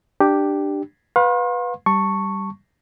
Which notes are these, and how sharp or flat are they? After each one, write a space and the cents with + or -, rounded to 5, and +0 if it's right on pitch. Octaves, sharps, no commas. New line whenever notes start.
D4 +15 G4 +0
B4 -5 F5 +40 C6 +40
G3 +0 A5 +20 C#6 +0